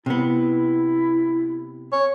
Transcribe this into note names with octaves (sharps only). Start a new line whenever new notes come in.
C3 B3 E4
C#5